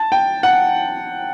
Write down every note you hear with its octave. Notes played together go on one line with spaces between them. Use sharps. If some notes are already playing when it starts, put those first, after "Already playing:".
Already playing: A5
G5
F#5